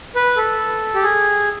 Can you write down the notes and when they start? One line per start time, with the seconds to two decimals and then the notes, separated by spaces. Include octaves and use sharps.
0.15 B4
0.36 A4
0.94 G4
1.03 G#4